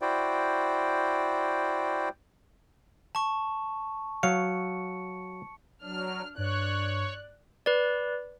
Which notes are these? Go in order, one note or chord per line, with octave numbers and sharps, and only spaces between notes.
E4 F#4 C5 D5 G5
A5 C#6
F#3 F5 C#7
F#3 D4 F6
G2 C#5 D5 F#6
B4 D5